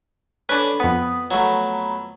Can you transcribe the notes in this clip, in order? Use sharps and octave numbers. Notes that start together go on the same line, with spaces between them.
C#4 D4 A4 B4 B5 D6
F2 B3 B4
D#6
F#3 A3 A#5 B5